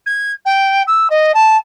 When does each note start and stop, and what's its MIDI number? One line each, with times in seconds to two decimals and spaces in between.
0.06 0.31 92
0.46 0.83 79
0.87 1.08 88
1.10 1.32 75
1.34 1.57 81